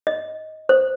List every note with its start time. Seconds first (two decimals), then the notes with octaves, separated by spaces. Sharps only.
0.07 D#5
0.69 C5